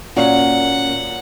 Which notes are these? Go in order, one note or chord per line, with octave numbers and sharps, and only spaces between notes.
A#2 F#3 A#3 C#4 F#5